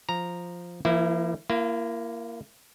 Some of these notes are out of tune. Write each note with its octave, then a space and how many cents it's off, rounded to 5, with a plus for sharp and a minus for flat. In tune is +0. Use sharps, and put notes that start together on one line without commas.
F3 +0 A#5 -5
F3 -45 A#3 +0 E4 +0
A#3 +0 E4 +40